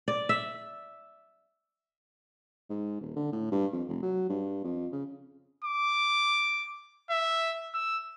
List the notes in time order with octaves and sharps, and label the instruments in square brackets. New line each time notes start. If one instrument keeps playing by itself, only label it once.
[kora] D5
E5
[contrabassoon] G#2
D#1
D3
A2
G2
F2
F1
F#3
G2
F2
C#3
[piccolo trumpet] D6
E5
E6